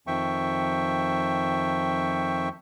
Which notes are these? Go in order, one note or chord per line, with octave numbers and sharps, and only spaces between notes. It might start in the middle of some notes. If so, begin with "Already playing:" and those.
F2 D#3 F3 E5 G5 C#6